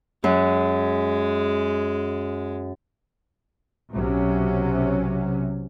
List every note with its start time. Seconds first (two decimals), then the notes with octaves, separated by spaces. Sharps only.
0.24 F#2 G#3
3.93 B1 C3 F#3 C#4